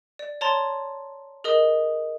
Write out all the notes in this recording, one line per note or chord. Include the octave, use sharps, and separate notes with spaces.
D5
C#5 A5 A#5 C6 A6
G#4 A#4 D#5 D#6